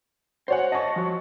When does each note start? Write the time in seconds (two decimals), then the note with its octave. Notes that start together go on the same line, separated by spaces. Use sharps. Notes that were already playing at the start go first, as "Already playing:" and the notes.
0.48 F#4 C5 C#5 F#5
0.72 C#5 D#5 A5 C#6
0.96 F3 F#4